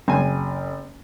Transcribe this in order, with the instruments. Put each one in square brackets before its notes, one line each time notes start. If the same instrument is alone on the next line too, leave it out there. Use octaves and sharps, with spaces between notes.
[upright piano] F#1 [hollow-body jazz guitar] C4 G#5